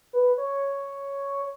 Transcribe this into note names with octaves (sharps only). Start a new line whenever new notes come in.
B4
C#5